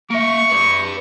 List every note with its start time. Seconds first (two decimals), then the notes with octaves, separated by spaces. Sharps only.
0.11 A#3 E5 C#6
0.50 B4 D5